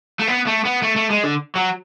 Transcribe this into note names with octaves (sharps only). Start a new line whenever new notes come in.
A3
B3
A3
B3
A3
A3
G#3
D3
F#3